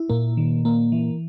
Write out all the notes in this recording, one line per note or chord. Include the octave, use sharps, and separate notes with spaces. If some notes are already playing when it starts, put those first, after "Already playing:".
Already playing: E4
A#2 A#3
D#3
A#3
E3